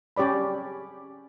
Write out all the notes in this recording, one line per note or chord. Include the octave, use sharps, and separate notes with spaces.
C#4 G4 C#5 D5 B5